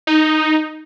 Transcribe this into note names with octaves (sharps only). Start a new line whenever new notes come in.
D#4